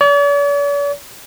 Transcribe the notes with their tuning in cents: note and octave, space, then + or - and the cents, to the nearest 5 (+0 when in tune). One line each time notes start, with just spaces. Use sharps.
D5 -45